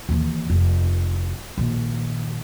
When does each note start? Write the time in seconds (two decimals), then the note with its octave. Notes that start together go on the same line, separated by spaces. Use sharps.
0.09 D#2 E3
0.50 F1
1.58 A#1 D#3